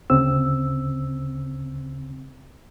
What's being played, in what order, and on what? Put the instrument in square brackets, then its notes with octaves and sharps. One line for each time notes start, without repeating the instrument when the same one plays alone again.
[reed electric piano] D2 C#3 C4 E6